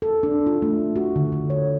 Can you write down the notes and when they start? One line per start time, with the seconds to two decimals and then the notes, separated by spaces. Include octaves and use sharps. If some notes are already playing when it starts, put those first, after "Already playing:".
0.02 A4
0.23 D4
0.46 F4
0.62 A3
0.96 F#4
1.16 D3
1.32 D3
1.50 C#5